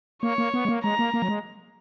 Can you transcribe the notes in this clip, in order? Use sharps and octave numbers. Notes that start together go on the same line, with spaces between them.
A#3 C#5
A#3
B3
G#3
A#3
G#3 A#5
A#3
A#3
F#3
G#3